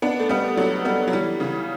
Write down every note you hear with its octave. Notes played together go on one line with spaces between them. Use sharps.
B3 D4
A3
G3 B3
F#3 A3
G3 B3
F#3
E3 G3
C#3 E3